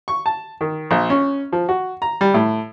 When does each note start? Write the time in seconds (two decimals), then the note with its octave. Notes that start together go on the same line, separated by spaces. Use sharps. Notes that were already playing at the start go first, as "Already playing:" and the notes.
0.08 C#6
0.26 A5
0.61 D#3
0.91 A#1
1.10 C#4
1.52 F3
1.69 F#4
2.02 A#5
2.21 G3
2.34 A2